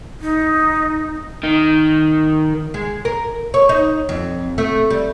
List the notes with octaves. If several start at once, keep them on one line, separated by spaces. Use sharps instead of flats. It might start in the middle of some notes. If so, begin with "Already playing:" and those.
D#4
D#3
G#3
A#4
C#5
D#4
F2
A3
G3